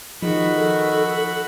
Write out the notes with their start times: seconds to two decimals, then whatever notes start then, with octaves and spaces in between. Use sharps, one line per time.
0.22 D#3 F3 F#4 G#4 B5
0.56 A4